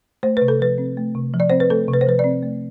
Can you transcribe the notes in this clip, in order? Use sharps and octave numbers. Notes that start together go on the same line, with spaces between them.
A3 C5
C3 B4
A4
F3 B4
C4
A3
C3
F3
D5
C4 C5
B4
A3 A4
C3
B4
C5
F3 B4
C4 D5
A3